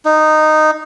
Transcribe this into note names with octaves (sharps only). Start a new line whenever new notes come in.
D#4